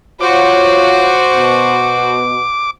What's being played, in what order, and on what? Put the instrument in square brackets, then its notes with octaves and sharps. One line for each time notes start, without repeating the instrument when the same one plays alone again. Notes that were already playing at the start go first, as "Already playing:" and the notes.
[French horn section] F4 C#5 [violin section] F#4 C5 [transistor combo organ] D6
[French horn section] B2